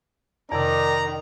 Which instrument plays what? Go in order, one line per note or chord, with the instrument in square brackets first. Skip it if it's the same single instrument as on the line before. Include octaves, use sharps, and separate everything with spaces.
[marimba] F2 C3 [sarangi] D#3 [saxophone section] D5 [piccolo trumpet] A#5